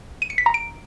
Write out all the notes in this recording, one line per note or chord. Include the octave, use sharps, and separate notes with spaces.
D#7
C#7
B6
A#5
D7